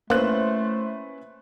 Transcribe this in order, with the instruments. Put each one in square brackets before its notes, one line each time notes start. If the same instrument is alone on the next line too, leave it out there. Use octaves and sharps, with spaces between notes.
[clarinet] A3 [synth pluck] A#3 [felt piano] C#4 E4 B4 [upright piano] C5 F#6